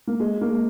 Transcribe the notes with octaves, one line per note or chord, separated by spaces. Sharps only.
A#3
G#3
A#3
G#3